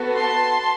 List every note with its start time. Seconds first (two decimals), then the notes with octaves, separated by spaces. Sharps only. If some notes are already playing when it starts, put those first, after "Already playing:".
Already playing: B3 F#4 A4
0.15 A5 C6